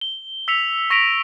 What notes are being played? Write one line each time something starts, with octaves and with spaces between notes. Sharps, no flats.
G7
E6 B6 C#7 F7
C#6 A#6 B6 D7 F7